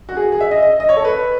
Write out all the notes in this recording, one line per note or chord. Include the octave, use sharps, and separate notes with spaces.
F#4
G#4
G#4
E5
D#5
D#5
D#5
C#5
A4
B4